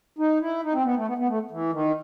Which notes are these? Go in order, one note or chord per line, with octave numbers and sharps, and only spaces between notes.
D#4
E4
D#4
C4
B3
A3
B3
B3
A3
E3
D#3